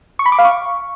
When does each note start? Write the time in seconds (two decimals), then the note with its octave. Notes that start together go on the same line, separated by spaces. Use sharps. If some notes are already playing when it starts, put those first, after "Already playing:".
0.19 C#6
0.26 B5
0.32 D6
0.39 F5
0.45 C#6